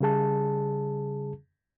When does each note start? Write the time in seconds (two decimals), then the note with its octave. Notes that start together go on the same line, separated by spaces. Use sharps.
0.01 C#3 G3 G#4 A5